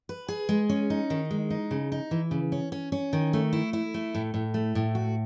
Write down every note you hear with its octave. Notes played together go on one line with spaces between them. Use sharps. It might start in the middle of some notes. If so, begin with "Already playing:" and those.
B4
G#4
G#3
C#4
D#4
D#3
G#3
D#4
C#3
D#4
E3
C#3
C#4
C#4
C#4
D#3
A3
E4
E4
A3
A2
A2
A3
A2
F#4